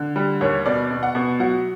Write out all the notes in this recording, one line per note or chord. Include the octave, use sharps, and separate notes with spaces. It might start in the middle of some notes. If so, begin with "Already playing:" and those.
Already playing: D3
G3
D#2 C#5
B2 D5
B2
F#5
B2
F#3 F#5